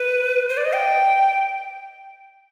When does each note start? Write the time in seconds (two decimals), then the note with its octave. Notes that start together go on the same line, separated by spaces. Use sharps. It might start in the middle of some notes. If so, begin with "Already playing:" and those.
Already playing: B4
0.49 C5
0.57 D5
0.65 D#5
0.73 G5